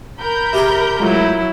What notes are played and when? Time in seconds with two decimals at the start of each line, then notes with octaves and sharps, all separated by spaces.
0.20 A#4 B5 G6
0.53 C3 G4 G#4 E5 A#5 F6
1.00 F#3 G#3 A3 E4 F4